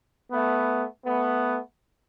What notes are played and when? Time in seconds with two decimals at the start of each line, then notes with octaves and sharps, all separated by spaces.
0.30 A3 B3
1.05 A3 B3